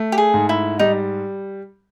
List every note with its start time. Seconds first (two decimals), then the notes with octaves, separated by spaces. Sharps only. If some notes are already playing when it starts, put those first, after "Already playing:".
Already playing: A3
0.12 G4
0.18 G#4
0.34 G#2
0.49 E4
0.79 G3 D#4